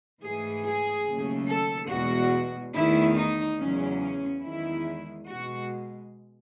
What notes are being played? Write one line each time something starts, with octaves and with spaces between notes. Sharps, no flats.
G#2 E3 A3 G#4
G#4
D#2 C#3 F#3 A3
A4
E2 B2 G#3 F#4
E2 D#3 A3 E4
D#4
E2 C#3 F#3 C#4
C#4
E2 D#3 G#3 E4
B2 G#3 F#4